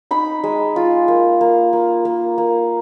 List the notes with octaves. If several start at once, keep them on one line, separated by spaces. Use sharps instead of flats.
D#4 B5
G#3
F4
A#3
A#3
A#3
A#3
A#3